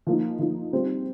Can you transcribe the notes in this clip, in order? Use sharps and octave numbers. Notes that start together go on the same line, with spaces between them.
F3 A#3 D#4
F3 A#3 D#4
G3 C4 F4 C5